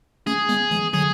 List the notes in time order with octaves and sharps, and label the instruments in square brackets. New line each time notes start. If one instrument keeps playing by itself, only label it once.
[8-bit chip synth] A3 C#4 [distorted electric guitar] G#4
[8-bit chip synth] G#3 B3
E3 G#3
[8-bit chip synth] D3 F#3 [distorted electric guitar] G#4